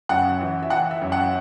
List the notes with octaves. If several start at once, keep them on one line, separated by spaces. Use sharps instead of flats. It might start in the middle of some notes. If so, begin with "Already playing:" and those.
F#2 F#5
E3
E5
E3 F#5
E5
F#2
F#5